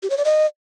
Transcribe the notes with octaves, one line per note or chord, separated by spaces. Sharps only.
G4
C#5
D5
D#5